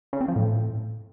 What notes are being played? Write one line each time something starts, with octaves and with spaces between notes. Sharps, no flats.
C#3
C4
F3
A2